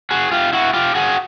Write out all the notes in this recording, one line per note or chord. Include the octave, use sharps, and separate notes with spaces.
F#4 G#4
F4 G4
E4 F#4
F4 G4
F#4 G#4